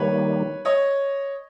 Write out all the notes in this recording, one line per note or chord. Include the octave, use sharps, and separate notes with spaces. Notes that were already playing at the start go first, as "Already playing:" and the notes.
Already playing: D#3 G3 A#3 B4 C#5
C#5 D#5